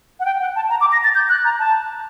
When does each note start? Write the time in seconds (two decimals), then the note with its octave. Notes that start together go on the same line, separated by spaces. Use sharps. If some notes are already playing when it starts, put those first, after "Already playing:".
0.20 F#5
0.25 G5
0.41 F#5
0.56 A5
0.70 A#5
0.81 D6
0.92 A#6
1.04 A6
1.15 G6
1.29 F#6
1.45 A#5
1.59 A5